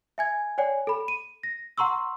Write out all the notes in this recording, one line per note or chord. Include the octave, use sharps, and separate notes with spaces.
E5 G#5 G#6
C#5 D5 G5 G#5
A4 B5
D#7
A#6
F#5 A#5 C6 C#6 E6